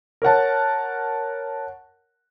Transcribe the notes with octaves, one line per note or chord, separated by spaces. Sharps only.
A#4 C#5 F#5 A5